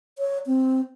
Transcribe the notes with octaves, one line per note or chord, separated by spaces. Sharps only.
C#5
C4